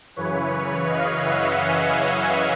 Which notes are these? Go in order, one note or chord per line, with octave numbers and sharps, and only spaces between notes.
F#2 C#3 E3 B4 C#5
D#5 F5
E5 F#5
F#5 G#5
F#5 G#5